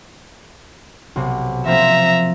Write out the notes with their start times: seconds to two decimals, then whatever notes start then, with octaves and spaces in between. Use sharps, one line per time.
1.16 B1 C3
1.66 F3 A#3 C4 E5 A#5